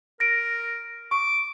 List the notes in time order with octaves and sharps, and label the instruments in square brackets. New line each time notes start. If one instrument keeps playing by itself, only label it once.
[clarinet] A#4 [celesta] A#6 D7
[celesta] C#6 [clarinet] D6